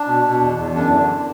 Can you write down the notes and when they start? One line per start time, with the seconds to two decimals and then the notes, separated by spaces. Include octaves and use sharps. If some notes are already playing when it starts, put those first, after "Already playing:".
Already playing: D4
0.08 B2
0.25 B2
0.42 E2
0.59 E2
0.75 F#2 D4
0.92 D3